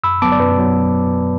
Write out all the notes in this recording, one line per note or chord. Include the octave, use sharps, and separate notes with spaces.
F#2 B5 E6
F#3 B3 A5 D6
D5
F#2 B4
F#3 B3